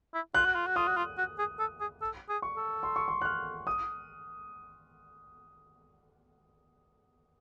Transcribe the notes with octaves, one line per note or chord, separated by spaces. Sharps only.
E4
F4 F#6
F#4
F4
F#4
F4 D#6
F#4
F4
F#4
G#4
A4
G#4
A4
G#4
C#6
A4
C6
C#6
C6
F#6
F6
D#6